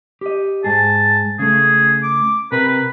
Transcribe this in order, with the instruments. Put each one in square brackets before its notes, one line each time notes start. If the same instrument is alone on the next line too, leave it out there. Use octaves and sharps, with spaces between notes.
[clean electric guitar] G4 D#5
[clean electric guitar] G#2 G#4 [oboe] A5
[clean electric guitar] C#3 A3 [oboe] G#4
[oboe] D6
[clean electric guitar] C3 A#4 [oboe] B4
[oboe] B4